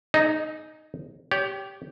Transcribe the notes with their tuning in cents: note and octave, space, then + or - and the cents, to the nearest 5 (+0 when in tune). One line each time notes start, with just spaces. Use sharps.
D#4 -10 G#4 +25 D#5 +35
G4 -5 C#5 +35